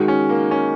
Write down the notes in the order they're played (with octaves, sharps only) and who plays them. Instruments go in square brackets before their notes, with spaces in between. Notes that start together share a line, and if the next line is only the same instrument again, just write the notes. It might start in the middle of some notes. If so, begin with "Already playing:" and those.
Already playing: [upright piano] D#3 [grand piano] G#3 F#4
[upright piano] C#4
A#3
C#4